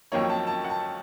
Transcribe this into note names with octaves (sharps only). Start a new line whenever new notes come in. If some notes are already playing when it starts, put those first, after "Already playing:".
F2 D#3 F#3 A#3 D#4 C#5
A5
A5
F#5
A5